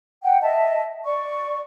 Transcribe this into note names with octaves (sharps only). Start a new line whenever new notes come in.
F#5 G5
D#5 E5 A5
D5 C#6